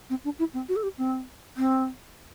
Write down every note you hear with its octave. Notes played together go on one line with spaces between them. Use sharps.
C4
D4
E4
C4
F#4
A4
G4
C4
C4